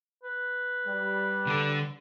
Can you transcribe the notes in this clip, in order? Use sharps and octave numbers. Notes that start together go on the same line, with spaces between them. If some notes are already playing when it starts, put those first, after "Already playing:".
B4
G3
D3 A4